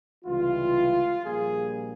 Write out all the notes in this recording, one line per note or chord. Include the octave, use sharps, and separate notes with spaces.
C#2 C3 E3 G3 F4
A#1 A#2 G3 G#4